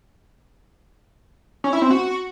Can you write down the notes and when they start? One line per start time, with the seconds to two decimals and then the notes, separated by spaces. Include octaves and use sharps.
1.64 C#4
1.73 E4
1.82 C4
1.91 F#4